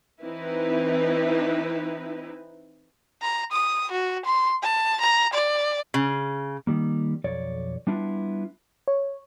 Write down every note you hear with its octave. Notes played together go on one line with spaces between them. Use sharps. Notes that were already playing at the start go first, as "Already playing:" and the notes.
E3 C4 D#4 E4 B4
A#5
D#6
F#4
C6
A5
A#5
D5
C#3
D#3 G3 A#3
B1 F2 C#5 D5
G3 B3 D4 E4 F4
C#5